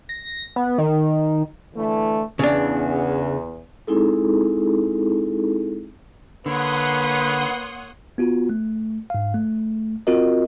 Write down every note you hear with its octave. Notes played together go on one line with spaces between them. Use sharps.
A#6
B3
D#3
D3 E3 A3
E2 C#3 D4
G#3 C4 D#4 E4 G#4 A4
D3 A#3 B4 C#5 F#5 C6 D#6
B3 F4 F#4
A3
G#2 F5
A3
C4 F4 F#4 A#4 D#5